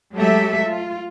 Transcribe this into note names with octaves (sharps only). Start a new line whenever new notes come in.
F#3 G#3 A3 G4 A4 E5
F4